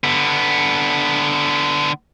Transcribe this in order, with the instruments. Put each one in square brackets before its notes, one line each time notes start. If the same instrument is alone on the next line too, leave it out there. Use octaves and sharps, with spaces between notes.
[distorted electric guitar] D3 B3